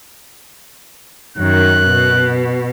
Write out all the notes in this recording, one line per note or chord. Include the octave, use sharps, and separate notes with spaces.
F#2 D#3 F#6
B2